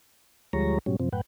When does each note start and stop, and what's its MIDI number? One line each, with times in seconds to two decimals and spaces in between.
0.53 0.79 38
0.53 0.79 53
0.53 0.79 55
0.53 0.79 56
0.53 0.79 73
0.53 0.79 82
0.86 0.96 44
0.86 0.96 47
0.86 0.96 54
0.86 0.96 55
0.86 0.96 61
1.00 1.09 42
1.00 1.09 48
1.00 1.09 53
1.00 1.09 60
1.13 1.21 42
1.13 1.21 45
1.13 1.21 71
1.13 1.21 78
1.13 1.21 79